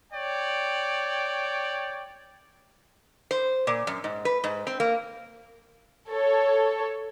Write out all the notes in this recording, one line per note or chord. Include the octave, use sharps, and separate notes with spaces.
C#5 D5 G5
C5
A#2
F#2
G#2
B4
G#2
C4
A#3
A4 C#5